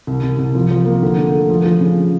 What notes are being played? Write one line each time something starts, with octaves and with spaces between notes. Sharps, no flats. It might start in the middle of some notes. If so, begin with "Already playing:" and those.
C2
C2
C2
F3
F3
A#3
D3
D3
A3
F3
F3
C#3